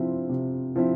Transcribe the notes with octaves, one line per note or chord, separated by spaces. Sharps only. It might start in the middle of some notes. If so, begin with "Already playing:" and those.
Already playing: C3 F3 C4 E4
C3
F3 C4 E4